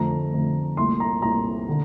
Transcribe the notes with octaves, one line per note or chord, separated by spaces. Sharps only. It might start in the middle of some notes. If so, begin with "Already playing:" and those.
Already playing: F2 D3 A3 A#5
F2 D3 A3
C2 A#2 A3 C6
A#5
C2 A#2 A3 A#5
D3